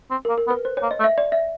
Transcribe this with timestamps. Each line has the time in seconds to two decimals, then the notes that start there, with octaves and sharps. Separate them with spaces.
0.11 C4
0.25 A#4
0.29 A#3
0.38 A#4
0.47 B3
0.51 B4
0.65 C5
0.77 C#5
0.83 A#3
0.91 D#5
1.00 A3
1.04 E5
1.18 D5
1.32 E5